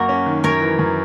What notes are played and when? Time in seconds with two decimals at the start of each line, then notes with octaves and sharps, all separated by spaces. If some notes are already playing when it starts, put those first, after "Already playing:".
Already playing: F#2 A#3 F#4 A#4
0.09 C#4
0.26 D#3
0.44 F#2 A#4 C#5
0.61 E3
0.79 F#2